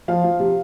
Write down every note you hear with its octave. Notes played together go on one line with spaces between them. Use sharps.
F3 F5
F3
C3